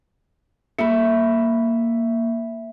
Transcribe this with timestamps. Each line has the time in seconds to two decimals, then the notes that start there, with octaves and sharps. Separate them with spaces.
0.79 A#3 E5 B5